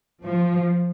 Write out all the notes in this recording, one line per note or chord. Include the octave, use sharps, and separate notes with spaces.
F3